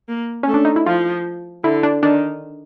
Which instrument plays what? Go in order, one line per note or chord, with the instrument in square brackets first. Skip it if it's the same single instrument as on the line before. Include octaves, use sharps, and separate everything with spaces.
[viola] A#3
[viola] A3 [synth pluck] C#4
[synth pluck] D4
D#4
E4
[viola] F3 [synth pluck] F4
[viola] D3 [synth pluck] E4
[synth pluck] D4
[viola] D#3 [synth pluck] D4